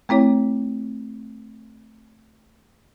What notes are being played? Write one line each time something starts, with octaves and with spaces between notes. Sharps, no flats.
A3 C4 E4 C#5